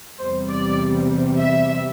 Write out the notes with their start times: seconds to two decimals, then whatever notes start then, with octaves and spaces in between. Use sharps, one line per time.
0.18 E2 C3 G3 C5
0.48 D5
1.37 E5